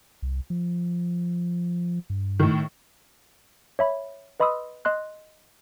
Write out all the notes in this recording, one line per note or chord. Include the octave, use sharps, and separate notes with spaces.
C2
F3
G2
A2 D#3
C#5 E5 B5
B4 D#5 B5 C6 D#6 E6
D#5 C6 F#6